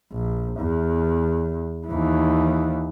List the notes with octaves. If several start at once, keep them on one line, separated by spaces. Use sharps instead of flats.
A#1
E2
D#2 E3